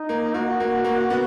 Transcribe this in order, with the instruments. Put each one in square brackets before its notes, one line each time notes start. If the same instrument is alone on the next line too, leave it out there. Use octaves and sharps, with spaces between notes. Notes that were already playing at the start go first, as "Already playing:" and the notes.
Already playing: [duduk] D#4
[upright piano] A#3
[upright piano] A#3 [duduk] F#4
[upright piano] A#3
A#3
B3